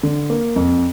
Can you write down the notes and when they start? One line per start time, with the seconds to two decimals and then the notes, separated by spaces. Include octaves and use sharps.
0.03 D3
0.30 A#3
0.56 F2